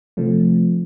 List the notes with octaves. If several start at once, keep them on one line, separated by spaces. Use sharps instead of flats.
C3 F3 A3 C4